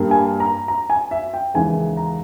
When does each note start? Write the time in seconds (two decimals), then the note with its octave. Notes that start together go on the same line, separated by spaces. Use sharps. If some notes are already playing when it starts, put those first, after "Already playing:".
Already playing: G2 G3 A#3
0.11 G#5
0.40 A#5
0.68 A#5
0.90 G#5
1.11 E5
1.34 G5
1.54 D#2 C#3 E3 G#3 G#5
1.97 A#5